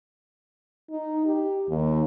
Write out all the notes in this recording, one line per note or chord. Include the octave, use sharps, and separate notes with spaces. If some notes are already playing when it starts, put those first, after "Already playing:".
D#4
G4
D#2